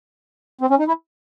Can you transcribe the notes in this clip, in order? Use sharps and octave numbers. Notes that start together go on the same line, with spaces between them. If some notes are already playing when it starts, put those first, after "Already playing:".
C4
C#4
D#4
E4